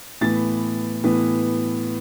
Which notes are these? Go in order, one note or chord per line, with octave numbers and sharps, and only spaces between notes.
A2 E3 B3 A6
A2 E3 B3